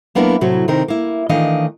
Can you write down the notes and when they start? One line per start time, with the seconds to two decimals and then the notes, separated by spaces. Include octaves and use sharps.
0.15 F#3 A#3 B3 D4 E4 A#4
0.41 A2 C3 F#3 F#4
0.68 C3 D#3 C4 D#4 A#4
0.88 A#3 E4
1.29 D#3 E3 A3 D4 D#5 F5